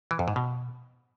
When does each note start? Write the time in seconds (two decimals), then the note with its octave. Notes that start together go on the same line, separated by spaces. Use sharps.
0.11 E3
0.19 F2
0.28 G#2
0.36 B2